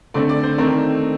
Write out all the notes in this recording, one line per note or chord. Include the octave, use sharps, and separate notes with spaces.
D3 A3 C4 D5
D5
C5
D#3 A3 C4 A#4